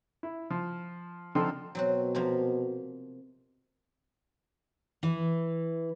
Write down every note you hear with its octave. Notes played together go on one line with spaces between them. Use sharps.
E4
F3
D3 F3 C4 D#4 F4 A4
B2 F#3 C4 F#4
C3 F3 A#3
E3